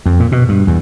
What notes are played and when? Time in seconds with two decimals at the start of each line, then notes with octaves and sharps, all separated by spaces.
0.06 F2
0.20 A#2
0.32 B2
0.49 G2
0.67 E2